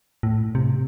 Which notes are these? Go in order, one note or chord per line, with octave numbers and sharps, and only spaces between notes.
A2
C3